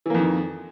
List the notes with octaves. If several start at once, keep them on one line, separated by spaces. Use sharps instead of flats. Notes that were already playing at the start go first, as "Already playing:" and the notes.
F2 D#3 E3 A#3